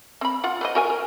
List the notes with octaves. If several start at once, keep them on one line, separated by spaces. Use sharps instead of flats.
C4 B5
F4 F#5
B4 C5 D#5
F#4 A#4 G#5
A#4